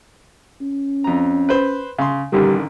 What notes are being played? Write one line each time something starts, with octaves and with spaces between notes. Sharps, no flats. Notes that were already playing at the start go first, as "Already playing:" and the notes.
C#4
F2 A#5
B4 C5
C#3 C6
A1 D3 D#3 G3